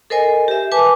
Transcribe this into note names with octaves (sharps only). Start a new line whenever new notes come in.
A4 A#4 C5 D#5 G#5
G4 E5
B4 G#5 A5 D6